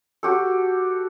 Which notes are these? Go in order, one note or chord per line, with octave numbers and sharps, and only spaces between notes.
F#4 G4 A4